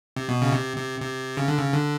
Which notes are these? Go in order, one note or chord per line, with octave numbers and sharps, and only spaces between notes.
C3
B2
C#3
C3
C3
C3
C#3
D3
C#3
D3